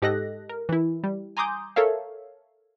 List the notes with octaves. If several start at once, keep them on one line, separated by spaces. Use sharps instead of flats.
G#2 G4 A4 D#5 F#6 A#6
A#4
E3 E4
G3
G#5 A#5 C6 D6 D#6 G6
A4 A#4 C#5 E5 F5